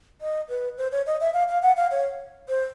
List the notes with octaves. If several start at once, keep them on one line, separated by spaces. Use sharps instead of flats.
D#5
B4
C5
C#5
D#5
E5
F5
F5
F#5
F5
C#5
C5